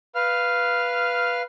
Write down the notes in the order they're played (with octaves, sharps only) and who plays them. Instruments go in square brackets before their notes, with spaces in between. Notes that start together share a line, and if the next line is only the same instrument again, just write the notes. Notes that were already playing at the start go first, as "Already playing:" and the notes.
[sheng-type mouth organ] B4 F5 F6